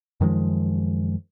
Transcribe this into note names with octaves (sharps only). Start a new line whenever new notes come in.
F#2 D#3 F3 G#3